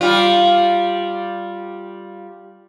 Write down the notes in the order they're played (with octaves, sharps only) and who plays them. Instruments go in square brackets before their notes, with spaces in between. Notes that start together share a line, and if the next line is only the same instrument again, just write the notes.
[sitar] G3 F4